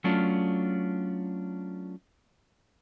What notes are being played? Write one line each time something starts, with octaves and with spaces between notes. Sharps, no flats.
F#3 A3 C#4 D4 F4